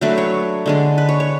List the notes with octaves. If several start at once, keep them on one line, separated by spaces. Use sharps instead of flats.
F#3 A3 D4 B4
C#5
D3 G#3 D4
B4
C#5
C#5